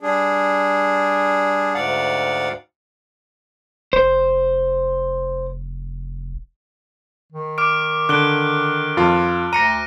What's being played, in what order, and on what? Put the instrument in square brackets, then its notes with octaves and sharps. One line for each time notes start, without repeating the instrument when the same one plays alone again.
[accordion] G3 D4 G#4
D2 G#2 D5 F5 F#5
[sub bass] F1 [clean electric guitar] C5
[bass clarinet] D#3
[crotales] D6 F6 D7
[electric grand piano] D3 [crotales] F#6 D7 G7
[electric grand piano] F2 F4
[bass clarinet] D2 [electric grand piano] A#5 [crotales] A#6 C#7 D#7